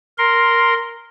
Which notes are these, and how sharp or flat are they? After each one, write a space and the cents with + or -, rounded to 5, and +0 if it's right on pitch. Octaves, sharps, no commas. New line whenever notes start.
A#4 +0 C6 +0